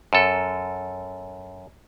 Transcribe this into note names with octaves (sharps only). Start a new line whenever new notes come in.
F#2 A4